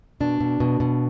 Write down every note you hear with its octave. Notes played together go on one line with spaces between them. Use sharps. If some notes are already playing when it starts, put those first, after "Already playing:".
B2 D4
B2
B2
B2